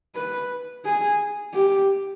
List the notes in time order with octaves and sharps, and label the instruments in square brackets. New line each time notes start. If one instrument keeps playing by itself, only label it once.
[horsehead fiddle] B4
G#4
G4